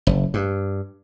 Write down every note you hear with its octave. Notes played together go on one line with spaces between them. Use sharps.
F#1
G2